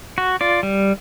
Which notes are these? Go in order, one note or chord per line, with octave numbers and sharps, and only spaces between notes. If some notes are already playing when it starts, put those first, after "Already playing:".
F#4
F4 D5
G3